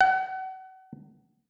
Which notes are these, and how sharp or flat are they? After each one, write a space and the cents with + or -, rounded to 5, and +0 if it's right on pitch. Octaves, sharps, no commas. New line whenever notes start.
F#5 +35